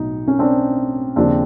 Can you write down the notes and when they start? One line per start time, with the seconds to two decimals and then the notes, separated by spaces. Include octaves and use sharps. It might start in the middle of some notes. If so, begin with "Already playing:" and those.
Already playing: B1 A2 F#3 D#4
0.27 C#4
0.39 C4 D4
1.16 D#2 C#3 F3 C4 D4